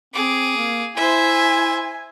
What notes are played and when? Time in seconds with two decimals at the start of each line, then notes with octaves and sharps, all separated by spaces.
0.14 C4 G#4 D6
0.57 A#3
0.97 E4 C5 E5 G#5